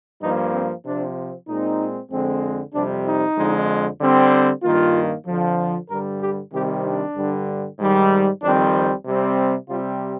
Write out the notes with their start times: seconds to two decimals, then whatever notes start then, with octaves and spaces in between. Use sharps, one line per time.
0.22 G2 F3 A#3 D#4
0.54 C4
0.85 C3 F3 C4 D4
1.48 A#2 G#3 C4 D#4
2.11 F2 D3 G#3 C4
2.74 F2 C3 G3 D4
3.06 D#4
3.38 F2 D3 G#3
4.01 D3 G3 C4
4.63 G2 D#3 A#3 F4
5.27 F2 D3 F3
5.90 G2 D3 G3 A#4
6.21 G4
6.53 C3 D#3 G3 C4 G4
6.85 D4
7.16 G2 D3 G3
7.79 G#2 D#3 G3
8.42 F2 D#3 G3 C4 D4
9.05 C3 G3 C4
9.69 C3 G3 C4 F4